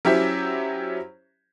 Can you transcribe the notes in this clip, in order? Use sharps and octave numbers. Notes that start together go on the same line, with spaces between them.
F#3 C#4 E4 G4 C5 E5